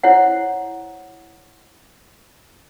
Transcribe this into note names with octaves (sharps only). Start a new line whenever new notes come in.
E4 C5 C#5 F#5